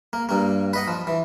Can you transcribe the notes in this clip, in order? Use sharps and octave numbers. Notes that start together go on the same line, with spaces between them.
A#3
G2 A#3
B4 D#5 F#5
F3
E3